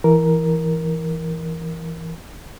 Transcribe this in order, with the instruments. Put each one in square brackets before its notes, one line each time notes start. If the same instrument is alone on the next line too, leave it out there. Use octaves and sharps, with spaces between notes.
[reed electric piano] E3 A#4